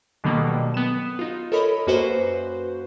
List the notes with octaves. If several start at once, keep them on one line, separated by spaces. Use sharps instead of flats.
B2 D3 D#3 F#3 G3 A#3
B3 E7
D#4 F4
A4 A#4 C#5 D#5 B5
F#2 A#3 F#4 B4 C5